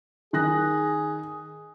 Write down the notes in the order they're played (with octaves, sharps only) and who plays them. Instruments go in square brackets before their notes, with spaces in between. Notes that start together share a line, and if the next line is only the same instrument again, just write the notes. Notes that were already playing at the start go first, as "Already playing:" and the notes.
[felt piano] D#3 F#6 A#6 [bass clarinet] G#4